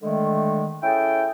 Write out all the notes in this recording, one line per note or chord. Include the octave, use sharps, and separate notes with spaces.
D3 D#3 G#3 A3
C#4 E4 G#4 A4 G5